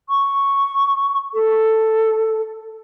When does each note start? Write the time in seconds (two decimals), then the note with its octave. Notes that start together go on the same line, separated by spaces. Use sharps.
0.09 C#6
1.34 A4